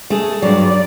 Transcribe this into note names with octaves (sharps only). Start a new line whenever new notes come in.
A3 G#4
G2 F#3 D5